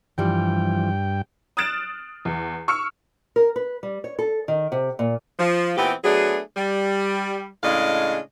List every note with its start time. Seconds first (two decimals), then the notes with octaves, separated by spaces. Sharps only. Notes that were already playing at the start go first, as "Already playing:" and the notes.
0.18 G2 E3 F3 G3 G5
1.57 D#6 F6 F#6 A6 D7 E7
2.25 E2
2.68 C#6 E6 F6 C#7
3.36 A#4
3.56 B4
3.83 G3
4.04 C#5
4.19 A4
4.48 D#3
4.72 C3
4.99 A#2
5.39 F3
5.77 A#2 E3 B3 C4 G4
6.04 F#3 A3 B3 D4 G#4
6.56 G3
7.63 A2 C#3 G#3 D4 D#5 F5